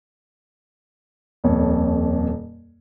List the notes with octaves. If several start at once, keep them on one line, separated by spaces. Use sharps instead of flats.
D#1 F2 A#2 C#5